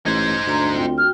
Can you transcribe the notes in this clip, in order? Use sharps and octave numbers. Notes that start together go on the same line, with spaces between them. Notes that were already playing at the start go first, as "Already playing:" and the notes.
A1 D#4 C5 G#6
D2 D4 A#5 C6
C4 F4 G5
F#4 G5 F6